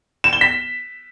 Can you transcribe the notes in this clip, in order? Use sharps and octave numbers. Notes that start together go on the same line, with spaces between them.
E7
G7
B6